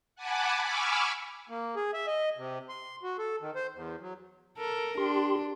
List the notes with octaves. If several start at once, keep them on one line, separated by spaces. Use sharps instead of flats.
F#5 G#5 A5 B5 D6
G#5 B5 C#6 D6 E6 F6
A#3
G#4
E5
D#5
C3
C6
F#4
A4
D#3
C5
E2
F#3
A4 A#4
D4 G4 C6